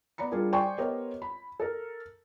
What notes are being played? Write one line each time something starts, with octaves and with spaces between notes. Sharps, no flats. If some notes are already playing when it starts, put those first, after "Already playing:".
B3 D5 A#5 B5 C#7
G3 D4 F4 G#4 A#4
C5 D5 G5 G#5 C6 C#6
B3 G4 A#4 C5 C#5 D#5
B5
A4 A#4